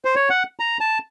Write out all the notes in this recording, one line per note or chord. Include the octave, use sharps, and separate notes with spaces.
C5
C#5
F#5
A#5
A5